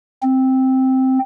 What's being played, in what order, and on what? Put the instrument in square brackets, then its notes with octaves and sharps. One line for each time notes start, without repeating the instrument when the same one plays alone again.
[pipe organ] C4